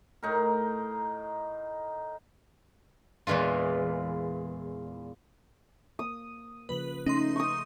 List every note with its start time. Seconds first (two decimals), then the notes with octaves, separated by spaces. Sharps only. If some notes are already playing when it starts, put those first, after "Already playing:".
0.23 A2 D#4 A#4
3.27 E2 A#2 E3 G#3 F4
5.99 A#3 D#6
6.69 C#3 F3 A#3 B4 F#7
7.06 C#3 A3 C#4 D#4 C6
7.36 C#6 D#6